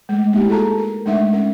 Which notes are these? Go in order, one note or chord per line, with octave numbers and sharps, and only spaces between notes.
G#3 A3
A3 A#3 D#4 E4 G4
F#4 G#4 A4 A5 A#5
A#4
G#3 A3 D4 D#4 E5 F#5
C#4 A#4